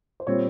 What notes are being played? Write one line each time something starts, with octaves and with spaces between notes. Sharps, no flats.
C5
A#2 G3 C4 C#5